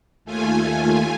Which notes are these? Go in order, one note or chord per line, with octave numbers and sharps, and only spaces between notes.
D#2 A3 F4 G#5